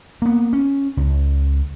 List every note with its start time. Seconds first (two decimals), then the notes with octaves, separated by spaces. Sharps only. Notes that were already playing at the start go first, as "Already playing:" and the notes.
0.22 A#3 B3
0.53 C#4
0.97 C#2